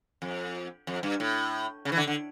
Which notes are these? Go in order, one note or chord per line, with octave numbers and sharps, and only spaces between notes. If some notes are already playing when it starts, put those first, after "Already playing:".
F2
F2
G2
A2
C#3
E3
D3
D3